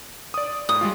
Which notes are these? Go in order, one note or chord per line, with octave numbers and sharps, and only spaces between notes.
D5 D#6
A2 D#6
G3 G#3 F4